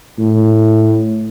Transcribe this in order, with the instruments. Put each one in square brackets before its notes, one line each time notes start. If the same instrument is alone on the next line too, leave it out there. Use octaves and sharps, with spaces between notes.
[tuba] A2